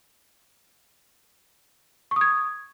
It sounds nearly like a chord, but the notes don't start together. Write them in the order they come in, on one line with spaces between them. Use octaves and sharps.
C#6 D#6 G#6